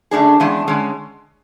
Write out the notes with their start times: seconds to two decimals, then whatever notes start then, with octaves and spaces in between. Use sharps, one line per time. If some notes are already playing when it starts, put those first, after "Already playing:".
0.11 F#2 D3 A3 D4 G#4
0.40 E2 C#3 G#3 D4
0.68 D3 G#3 C#4